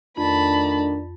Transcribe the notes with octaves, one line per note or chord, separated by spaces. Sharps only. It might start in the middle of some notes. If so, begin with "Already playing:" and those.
F2 D#3 A3 D4 A5 B5